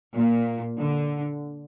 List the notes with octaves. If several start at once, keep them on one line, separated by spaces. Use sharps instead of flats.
A#2
D3